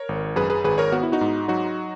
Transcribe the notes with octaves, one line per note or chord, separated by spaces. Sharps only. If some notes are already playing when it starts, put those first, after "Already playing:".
Already playing: A#4 C#5
G#1
F#2 G#4 B4
G#4 B4
G#1 G#4 B4
A#4 C#5
B3 F#4
E4
D#4 F#4
G#2
F#3 D#4 F#4